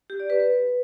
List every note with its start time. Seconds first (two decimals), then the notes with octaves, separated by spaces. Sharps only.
0.10 G4
0.20 D5
0.30 B4
0.40 B4